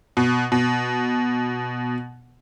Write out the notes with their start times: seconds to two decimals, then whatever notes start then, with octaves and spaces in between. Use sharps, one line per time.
0.17 B2
0.52 B2